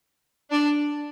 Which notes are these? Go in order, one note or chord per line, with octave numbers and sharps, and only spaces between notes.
D4